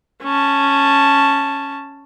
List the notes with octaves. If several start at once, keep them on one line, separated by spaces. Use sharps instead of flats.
C#4 A5